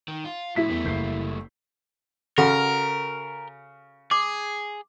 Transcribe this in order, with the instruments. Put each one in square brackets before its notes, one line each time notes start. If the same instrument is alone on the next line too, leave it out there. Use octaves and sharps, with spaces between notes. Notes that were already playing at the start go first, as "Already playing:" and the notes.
[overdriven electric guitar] D#3
F4
[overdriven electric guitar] A2 F3 [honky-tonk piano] E4 B6
[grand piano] E2 [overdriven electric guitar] G3 A3
[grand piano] F#1 G6 C7
[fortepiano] C#3 [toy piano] F#4 A4 F#5 [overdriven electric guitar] A#4
[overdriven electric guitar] G#4 [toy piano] D6